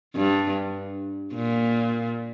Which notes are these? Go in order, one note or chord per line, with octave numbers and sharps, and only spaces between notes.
G2
A#2